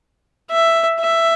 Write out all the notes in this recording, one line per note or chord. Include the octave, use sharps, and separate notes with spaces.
E5
E5